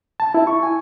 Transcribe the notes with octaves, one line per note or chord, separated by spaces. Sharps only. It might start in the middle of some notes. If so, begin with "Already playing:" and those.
A5
E4
C#6
G#5